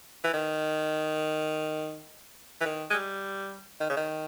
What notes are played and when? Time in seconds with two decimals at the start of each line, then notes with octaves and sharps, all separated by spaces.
0.24 E3
0.34 D#3
2.61 E3
2.66 D#3
2.90 G#3
2.94 G3
3.81 D#3
3.90 C#3
3.97 D#3